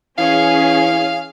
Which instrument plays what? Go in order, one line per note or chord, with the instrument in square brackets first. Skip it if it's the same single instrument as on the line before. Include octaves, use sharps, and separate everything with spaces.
[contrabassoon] E3 [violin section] C#4 G#4 [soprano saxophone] F5